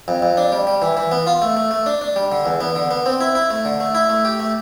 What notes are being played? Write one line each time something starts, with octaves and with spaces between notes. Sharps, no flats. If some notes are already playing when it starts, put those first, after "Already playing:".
F2
F2
D4
G3
G3
E3
E3
B3
F4
A3
A3
A3
D4
D4
G3
D3
E2
B3
D3
B3
C4
E4
E4
A3
D3
A3
E4
A3
G4
A3